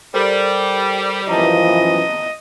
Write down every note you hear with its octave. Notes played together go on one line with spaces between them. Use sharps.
G3 A4 A#4 C5
F#2 E3 F3 D#5 A5 A#5